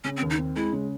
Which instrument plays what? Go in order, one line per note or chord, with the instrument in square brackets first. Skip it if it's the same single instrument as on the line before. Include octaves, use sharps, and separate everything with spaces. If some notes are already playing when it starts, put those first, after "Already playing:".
[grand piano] C#3 [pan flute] C#4
[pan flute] C4
[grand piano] D#2
[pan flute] D#4
[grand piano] C4
[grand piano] G#3 [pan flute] E4
[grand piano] C#3